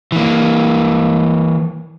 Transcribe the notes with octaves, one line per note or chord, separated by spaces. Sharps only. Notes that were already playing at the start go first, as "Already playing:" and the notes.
E3 A#3